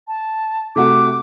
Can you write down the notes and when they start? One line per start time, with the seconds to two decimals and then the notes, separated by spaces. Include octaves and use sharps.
0.08 A5
0.76 C3 A3 F#4 D6